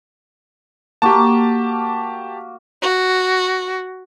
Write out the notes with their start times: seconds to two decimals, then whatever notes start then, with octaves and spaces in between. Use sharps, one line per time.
1.02 A#3 F#4 G4 A5
2.82 F#4